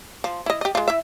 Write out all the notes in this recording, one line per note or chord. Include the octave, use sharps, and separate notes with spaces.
F3
E4 D#5
G4 D#5
G#3 F4
E4 E5